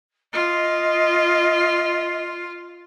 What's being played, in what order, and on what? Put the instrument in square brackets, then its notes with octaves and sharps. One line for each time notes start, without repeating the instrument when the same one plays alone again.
[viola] F4 [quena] D#5